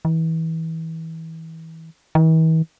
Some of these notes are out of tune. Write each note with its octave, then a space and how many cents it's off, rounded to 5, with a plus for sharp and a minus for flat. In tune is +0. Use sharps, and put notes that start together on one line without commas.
E3 -30
E3 -45